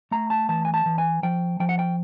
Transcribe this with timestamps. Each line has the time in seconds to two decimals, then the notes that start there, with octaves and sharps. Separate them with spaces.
0.11 A3 A#5
0.30 A5
0.49 E3 A5
0.65 G#5
0.74 A5
0.86 E3
0.98 G#5
1.23 F3 G5
1.60 F3 G5
1.69 F#5
1.79 G5